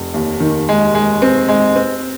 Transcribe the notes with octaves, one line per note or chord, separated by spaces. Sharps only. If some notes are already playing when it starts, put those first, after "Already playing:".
Already playing: F1
D#2
D#3
G#3
G#3
C4
G#3
C4